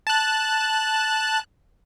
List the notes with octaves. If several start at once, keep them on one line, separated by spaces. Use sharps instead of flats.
A5 F#6